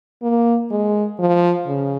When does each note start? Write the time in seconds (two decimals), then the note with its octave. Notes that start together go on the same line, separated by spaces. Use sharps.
0.23 A#3
0.71 G#3
1.19 F3
1.67 C#3